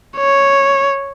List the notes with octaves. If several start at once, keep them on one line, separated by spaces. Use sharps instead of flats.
C#5